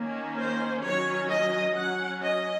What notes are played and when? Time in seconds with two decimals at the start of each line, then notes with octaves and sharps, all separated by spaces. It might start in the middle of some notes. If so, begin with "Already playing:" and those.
Already playing: D#3 A#3 C#4
0.38 C5
0.84 D#3 F#3 C#4 C#5
1.30 D#5
1.76 F#3 C#4 F#5
2.23 D#5